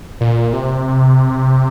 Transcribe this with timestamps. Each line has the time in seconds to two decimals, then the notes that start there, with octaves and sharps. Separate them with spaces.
0.21 A#2
0.53 C3